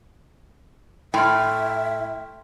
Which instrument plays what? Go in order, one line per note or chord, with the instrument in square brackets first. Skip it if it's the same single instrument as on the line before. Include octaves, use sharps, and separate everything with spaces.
[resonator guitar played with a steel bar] A2 [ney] E5 [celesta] G5 C6 F6